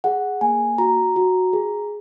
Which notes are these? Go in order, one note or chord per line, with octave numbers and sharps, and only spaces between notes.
G#4 F#5
A#3 G#5
F#4 A#5
F#4
G#4